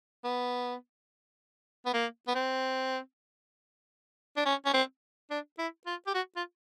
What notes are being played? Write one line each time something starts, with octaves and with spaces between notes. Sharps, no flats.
B3
B3
A#3
B3
C4
D4
C#4
C#4
C4
D4
E4
F4
G4
F#4
F4